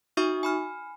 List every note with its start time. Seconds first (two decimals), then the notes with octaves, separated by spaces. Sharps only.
0.17 D#4 F#4 E5 C#6 D#6
0.43 G#5 B5 F6